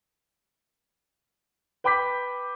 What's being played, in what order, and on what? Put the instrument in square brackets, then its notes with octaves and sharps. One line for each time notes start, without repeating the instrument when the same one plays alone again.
[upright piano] B4 G5 B5 D6 G6 B6